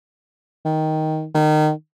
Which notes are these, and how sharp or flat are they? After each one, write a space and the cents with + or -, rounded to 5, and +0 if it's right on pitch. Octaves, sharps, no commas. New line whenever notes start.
D#3 +10
D#3 -25